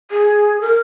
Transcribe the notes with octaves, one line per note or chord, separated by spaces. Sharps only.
G#4
A#4